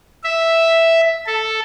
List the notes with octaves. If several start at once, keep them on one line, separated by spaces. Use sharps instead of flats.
E5
A4